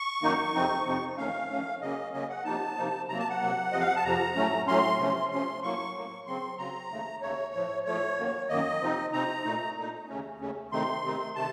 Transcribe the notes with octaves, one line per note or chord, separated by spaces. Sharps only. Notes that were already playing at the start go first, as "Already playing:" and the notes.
Already playing: C#6
F#2 D#3 A#3 D#4
F2 C3 F3 C4 D#4
F2 C3 F3 C4 D#4
F2 D#3 A3 C#4 F5
F2 D#3 A3 C#4
C#3 F#3 A#3 C#4 D#5
C#3 F#3 A#3 C#4 D#5
F#5
C3 F3 A#3 D#4 A5
C3 F3 A#3 D#4
C3 F#3 A#3 A#5
A5
F#5
C3 F#3 A#3
F2 C3 F3 D#5
F5
F#5
A5
F2 C3 F3 A#5
A2 F#3 A3 C#4
A2 F#3 A3 C#4 C6
C3 F3 A3 C#4
C3 F3 A3 C#4 C6
A2 F#3 A#3 C#6
A2 F#3 A#3
C#3 F#3 C4 C6
C#3 F#3 C4 A#5
D#2 C#3 A3
D#2 C#3 A3 C#5
A2 F3 A3
A2 F3 A3 C#5
F#2 D#3 A#3
F#2 D#3 A#3 D#5
C3 F3 C4 D#4
C3 F3 C4 D#4 A#5
A#2 A3 D#4
A#2 A3 D#4
D#2 C#3 A3 C#4
D#2 C#3 A3 C#4
C3 D#3 A3 C4 D#4 C6
C3 D#3 A3 C4 D#4
C3 D#3 A3 A5